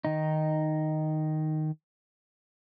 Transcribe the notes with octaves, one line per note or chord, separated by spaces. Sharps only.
D#3 D#4